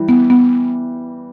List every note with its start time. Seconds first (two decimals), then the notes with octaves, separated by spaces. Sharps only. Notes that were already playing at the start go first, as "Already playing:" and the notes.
Already playing: E3 G3
0.09 B3
0.30 B3